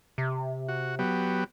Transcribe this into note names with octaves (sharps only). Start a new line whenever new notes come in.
C3
F#4
F#3 B3 G4